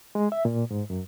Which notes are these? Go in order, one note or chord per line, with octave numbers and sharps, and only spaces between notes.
G#3
E5
A#2
G#2
F#2